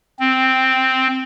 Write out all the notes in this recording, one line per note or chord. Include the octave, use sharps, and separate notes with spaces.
C4